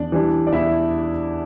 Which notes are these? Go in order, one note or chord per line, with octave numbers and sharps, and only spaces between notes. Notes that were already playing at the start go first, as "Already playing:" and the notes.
Already playing: E2 D4 D5
E3 G3 D4
D5
E2 E4 E5